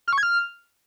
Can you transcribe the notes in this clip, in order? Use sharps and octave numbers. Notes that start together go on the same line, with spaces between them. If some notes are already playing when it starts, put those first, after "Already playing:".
F6
C#6
G#6
F6